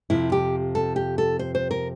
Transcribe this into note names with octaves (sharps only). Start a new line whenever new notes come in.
F2 C3 F3 E4
G4
A4
G4
A4
C5
C5
A#4